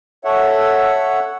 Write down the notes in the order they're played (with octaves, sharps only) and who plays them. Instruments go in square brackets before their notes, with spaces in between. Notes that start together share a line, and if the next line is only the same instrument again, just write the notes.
[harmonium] A4 C#5 E5 F#5